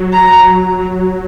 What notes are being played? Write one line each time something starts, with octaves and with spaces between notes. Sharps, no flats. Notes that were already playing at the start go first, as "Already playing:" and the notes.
Already playing: F#3
A#5